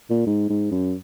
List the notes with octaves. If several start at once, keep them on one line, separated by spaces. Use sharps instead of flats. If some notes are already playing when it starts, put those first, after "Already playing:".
A#2
G#2
G#2
F#2